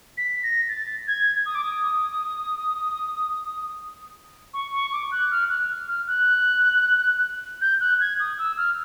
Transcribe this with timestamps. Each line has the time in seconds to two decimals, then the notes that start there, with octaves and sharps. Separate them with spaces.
0.18 B6
0.43 A#6
0.69 A6
1.08 G#6
1.46 D#6
1.55 D6
1.64 D#6
4.54 C#6
4.73 C#6
4.93 D6
5.12 F#6
5.31 F6
5.49 F#6
5.88 F6
6.08 F#6
7.61 G6
7.80 F#6
8.01 G#6
8.20 D#6
8.39 E6
8.58 F6